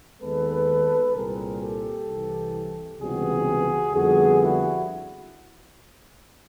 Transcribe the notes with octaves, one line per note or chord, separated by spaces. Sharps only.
D#2 D#3 G#3 B3 A4 B4
C2 A#2 G3 C4 G#4 A#4
G4 A4
C2 C3 E3
C#2 C3 E3 G3 B3 F#4 G#4
F2 D3 G3 B3 F#4 G#4
E4 F#4